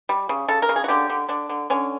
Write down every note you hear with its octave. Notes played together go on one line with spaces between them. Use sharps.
G3
C#3
C#3 A4
A#4
C#3
G#4
F#4
D3 G4
D3
D3 D4
D3
D3 C#4